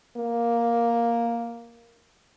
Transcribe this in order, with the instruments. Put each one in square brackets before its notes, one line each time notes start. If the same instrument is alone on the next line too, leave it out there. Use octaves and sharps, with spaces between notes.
[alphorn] A#3